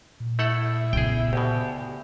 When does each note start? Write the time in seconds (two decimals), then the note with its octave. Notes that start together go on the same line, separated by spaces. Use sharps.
0.20 A#2
0.39 A3 E4 A4 F#5
0.93 C#3 B3 G#4 G5
1.33 D2 B2 G4